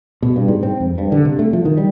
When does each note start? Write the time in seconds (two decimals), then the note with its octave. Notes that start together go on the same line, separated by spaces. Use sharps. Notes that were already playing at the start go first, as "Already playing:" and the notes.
0.23 B2
0.36 G2
0.48 G#2
0.63 C4
0.80 F2
0.98 G2
1.12 D3
1.25 C3
1.39 A3
1.53 F3
1.65 D#3
1.77 G3